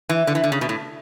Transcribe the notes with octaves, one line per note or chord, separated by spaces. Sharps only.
E3
D3
E3
D3
C#3
B2
A2